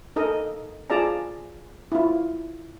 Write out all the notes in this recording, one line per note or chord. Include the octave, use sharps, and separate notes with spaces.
D#4 A4 A#4 D#5
F4 G#4 D5 A5 A#5
E4 F4